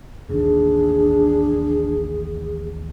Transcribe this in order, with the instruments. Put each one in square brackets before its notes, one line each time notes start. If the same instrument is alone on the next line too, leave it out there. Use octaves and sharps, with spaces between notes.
[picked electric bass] A1 D#2 [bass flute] D4 [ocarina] G#4